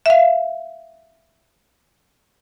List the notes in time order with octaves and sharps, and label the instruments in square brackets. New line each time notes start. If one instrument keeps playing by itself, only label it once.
[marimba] E5 F5